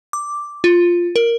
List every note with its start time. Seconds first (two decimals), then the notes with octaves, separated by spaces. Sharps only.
0.13 D6
0.64 F4
1.16 A#4